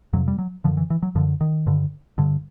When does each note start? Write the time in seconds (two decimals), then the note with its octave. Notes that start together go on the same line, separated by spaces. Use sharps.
0.13 F2 C3 F#3
0.28 G3
0.38 F#3
0.64 F#2 D3 F3
0.77 E3
0.90 E3
1.03 F#3
1.15 F#2 D3 F3
1.41 D#3
1.67 G2 D3
2.18 G2 D3